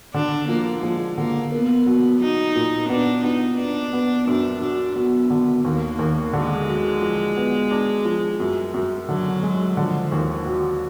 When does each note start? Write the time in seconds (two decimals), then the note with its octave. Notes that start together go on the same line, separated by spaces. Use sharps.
0.14 D3 D4
0.49 F3 A#3
0.83 F3 G#3
1.18 D3 A#3
1.52 A#3 B3
1.86 F#3
2.21 F#3 D#4
2.55 A#2
2.89 B3 D4
3.24 B3 D#4
3.58 B3 D4
3.93 B3
4.27 F#2 D4
4.61 F#3 D4
4.96 F#3 B3
5.30 D3
5.65 D#2 A#3
5.99 D#2
6.33 D3 G#3
6.68 F#3
7.02 F3
7.36 B3
7.71 D4
8.05 F3
8.40 F#2
8.74 F#2
9.09 D3 F#3
9.43 G#3
9.77 D3 F3
10.12 D#2
10.46 F#3